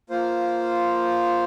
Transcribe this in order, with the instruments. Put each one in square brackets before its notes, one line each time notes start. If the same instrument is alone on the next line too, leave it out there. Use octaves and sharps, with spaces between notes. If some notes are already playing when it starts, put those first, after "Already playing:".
[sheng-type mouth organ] A#3 F4 C5